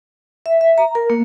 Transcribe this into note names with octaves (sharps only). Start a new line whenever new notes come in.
E5
E5
A#5
A#4
A#3